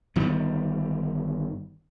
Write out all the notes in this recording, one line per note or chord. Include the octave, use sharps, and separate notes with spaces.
G1 D#3 G3 B3